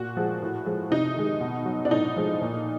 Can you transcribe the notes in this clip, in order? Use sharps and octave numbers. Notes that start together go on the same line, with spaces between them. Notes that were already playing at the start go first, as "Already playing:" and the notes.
Already playing: A#2 F#4
F3 G#3
A2
F3 G#3
C3 D#4
D#3 G#3
B2
F#3
D4
A2 D#4
F3 G#3
A#2